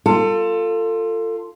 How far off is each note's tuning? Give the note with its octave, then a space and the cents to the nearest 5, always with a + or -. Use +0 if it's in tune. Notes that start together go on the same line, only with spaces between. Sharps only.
F4 +0 A4 +25